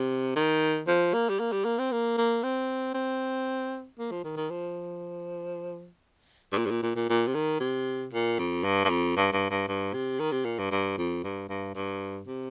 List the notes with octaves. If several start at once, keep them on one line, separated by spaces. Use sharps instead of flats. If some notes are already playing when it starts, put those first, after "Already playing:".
Already playing: C3
D#3
F3
A#3
G3
A#3
G3
A#3
C4
A#3
A#3
C4
C4
A#3
F3
D#3
D#3
F3
G2
A#2
G2
A#2
A#2
A#2
A#2
C3
D#3
C3
A#2
F2
G2
G2
F2
G2
G2
G2
G2
C3
D#3
C3
A#2
G2
G2
F2
G2
G2
G2
C3